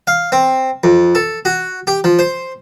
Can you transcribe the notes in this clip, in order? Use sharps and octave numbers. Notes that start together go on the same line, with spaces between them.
F5
C4
F2
A4
F#4
G4
F3
C5